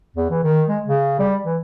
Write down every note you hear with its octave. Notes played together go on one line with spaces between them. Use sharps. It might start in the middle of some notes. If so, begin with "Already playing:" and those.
E2
E3
D#3
G#3
C#3
G3
E3